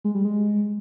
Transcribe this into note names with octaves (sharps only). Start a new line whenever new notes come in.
G#3
G3
G#3